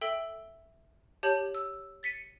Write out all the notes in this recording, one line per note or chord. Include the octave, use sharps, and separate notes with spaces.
A4 E5 G5 E6 G7
G4 C#5 A5 G6 F#7
E6
A6 B6 C#7 D#7